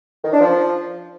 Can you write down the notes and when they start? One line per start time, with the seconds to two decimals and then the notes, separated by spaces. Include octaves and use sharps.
0.24 D#3
0.32 D4
0.40 F3